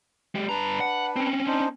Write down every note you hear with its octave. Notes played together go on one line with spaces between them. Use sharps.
G#3 G4
G2 D4 B4 A#5
F#5
C4 C#4
D4 D#4 C5